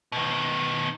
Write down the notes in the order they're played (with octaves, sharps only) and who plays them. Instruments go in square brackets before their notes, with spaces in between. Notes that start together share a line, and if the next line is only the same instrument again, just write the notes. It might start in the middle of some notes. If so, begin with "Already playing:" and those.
[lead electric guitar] B2 D#3